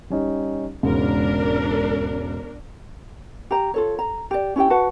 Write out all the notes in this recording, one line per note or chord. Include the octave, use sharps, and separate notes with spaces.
G3 C#4 D#4
E1 G#2 C#3 D4 A#4
G4 A#5
F4 A4 C#5
A#5
G4 D5
C#4 E4 G4 G5
F#4 B4 F#5 A5